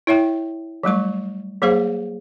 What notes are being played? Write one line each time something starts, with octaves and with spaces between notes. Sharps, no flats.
E4 C#5 E5 G5
F#3 G3 A3 C#6
F#3 A#3 G#4 C5 F5